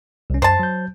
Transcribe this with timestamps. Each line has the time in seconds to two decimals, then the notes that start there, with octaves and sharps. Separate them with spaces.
0.30 C2 C#4
0.42 F#2 C5 A5 C6
0.59 F#3 G6